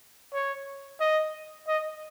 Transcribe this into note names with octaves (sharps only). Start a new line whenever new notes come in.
C#5
D#5
D#5